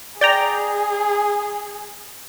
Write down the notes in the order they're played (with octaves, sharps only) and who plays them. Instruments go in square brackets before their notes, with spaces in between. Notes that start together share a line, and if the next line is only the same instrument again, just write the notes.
[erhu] G#4 [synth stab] D5 G5 A#5